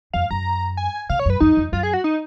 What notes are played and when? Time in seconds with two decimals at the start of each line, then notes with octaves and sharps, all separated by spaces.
0.13 F2 F5
0.31 F#2 A#5
0.77 G#5
1.10 C#3 F5
1.19 C#5
1.26 F#2 B4
1.40 F2 D#4
1.57 F2
1.72 F#2 F4
1.83 G#4
1.94 F#4
2.04 D#4